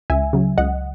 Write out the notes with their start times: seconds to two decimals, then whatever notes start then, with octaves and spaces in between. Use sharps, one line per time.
0.10 C#2 E5 G#5
0.33 C#3 F#3
0.58 C#2 D#5 F#5